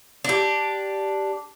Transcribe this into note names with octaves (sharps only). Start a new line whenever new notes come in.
D4 G4